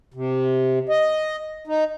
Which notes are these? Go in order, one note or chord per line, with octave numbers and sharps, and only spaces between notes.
C3
D#5
D#4